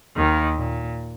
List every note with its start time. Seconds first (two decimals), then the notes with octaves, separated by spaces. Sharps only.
0.17 D#2 D#3
0.58 A#2